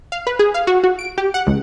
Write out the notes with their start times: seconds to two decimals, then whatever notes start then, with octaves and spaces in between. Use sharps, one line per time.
0.12 F5
0.27 B4
0.39 G#4
0.54 F5
0.67 F#4
0.84 F#4
0.99 D7
1.18 G4
1.34 F#5
1.47 C#2